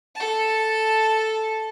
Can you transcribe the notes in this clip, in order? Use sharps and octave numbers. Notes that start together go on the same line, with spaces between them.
A4 A5